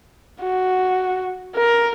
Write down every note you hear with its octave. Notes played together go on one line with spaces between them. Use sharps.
F#4
A#4